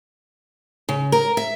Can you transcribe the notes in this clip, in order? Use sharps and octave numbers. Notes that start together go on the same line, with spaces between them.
C#3
A#4
E5